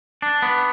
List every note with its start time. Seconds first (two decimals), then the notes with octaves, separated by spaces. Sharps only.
0.22 D4
0.42 B3